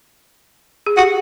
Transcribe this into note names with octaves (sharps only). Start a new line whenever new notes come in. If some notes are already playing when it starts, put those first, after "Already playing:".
G#4
F#4 G4